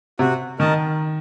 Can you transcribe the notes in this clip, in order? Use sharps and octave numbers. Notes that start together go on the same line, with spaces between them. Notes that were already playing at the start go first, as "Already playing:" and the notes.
C3 F#4
D#3 A#4 D#5 A5